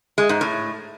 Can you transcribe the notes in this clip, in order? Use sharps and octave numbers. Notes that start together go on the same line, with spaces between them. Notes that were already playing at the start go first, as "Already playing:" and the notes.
G#3
G#2
A2